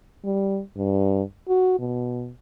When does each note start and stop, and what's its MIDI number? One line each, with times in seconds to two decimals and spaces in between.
0.25 0.61 55
0.77 1.22 43
1.49 1.75 66
1.79 2.32 47